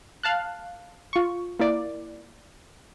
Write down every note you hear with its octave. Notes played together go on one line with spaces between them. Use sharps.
F5 A5 F#6
F4 C#6
A#3 E4 D5